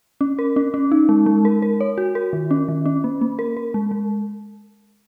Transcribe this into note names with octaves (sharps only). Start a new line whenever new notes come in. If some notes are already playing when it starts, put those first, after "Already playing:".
C#4
A#4
C#4
C#4
D#4
G#3
G#3
A#4
A#4
C#5
F#4
A#4
D#3
C#4
D#3
C#4
A#3
A#3
A#4
A#4
G#3
G#3